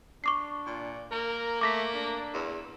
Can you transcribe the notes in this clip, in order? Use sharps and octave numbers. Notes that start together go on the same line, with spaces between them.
D4 C#6 D6 C7
A#2
A#3 A#4
A3 D6 A#6 B6
D4
E2